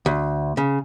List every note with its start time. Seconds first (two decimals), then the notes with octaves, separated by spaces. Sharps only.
0.06 D2
0.57 C#3